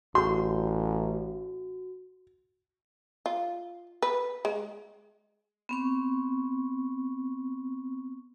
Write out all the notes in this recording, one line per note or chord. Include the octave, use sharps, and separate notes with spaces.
A1 F#4 C6
F4
B4
G#3
B3 C4 C#6